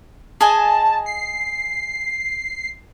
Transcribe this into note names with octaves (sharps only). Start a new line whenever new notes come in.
G#4 D#5 G#5 A5
C7